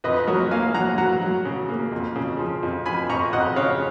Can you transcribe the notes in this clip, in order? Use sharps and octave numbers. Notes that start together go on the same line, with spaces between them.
F2 B4 D#5
F#3 A#4 C#5
A#3 F5 G#5
F#3 F#5 A#5
F#3 F#5 A#5
F#3
C#3
A#3
F2
C#3
F3
F2
F3 G#5 B5
F2 A#5 C#6
F2 D#5 F#5
C#3 C#5 F5